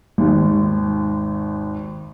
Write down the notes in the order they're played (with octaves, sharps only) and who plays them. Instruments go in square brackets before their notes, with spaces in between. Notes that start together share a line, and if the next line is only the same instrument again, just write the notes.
[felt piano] G#1 D#2